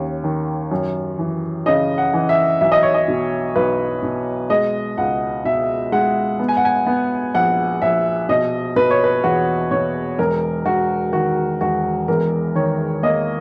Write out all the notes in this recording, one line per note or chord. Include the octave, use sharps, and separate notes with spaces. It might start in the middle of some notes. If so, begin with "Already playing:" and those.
Already playing: D#2 C#4
D#3
F#2
E3
C#3 D#5
F#5
E3
E5
B1 E5
D#5
C#5
D#5
B2
B1 B4
B2
G#3 D#5
C#2 F#5
B2 E5
G#3 F#5
B3
G#5
F#5
G#5
B3
A#1 F#5
A#1 E5
B2 D#5
B2 B4
C#5
B4
E2 F#4
B2 C#5
E1 A#4
E1 F#4
D#3 F#4
E1 F#4
E2 A#4
D#3 C#5
A#3 D#5